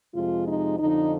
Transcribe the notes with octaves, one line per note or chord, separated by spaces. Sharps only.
F2 C3 F3 G#3 F4
D#4
F2 D3 F3 D#4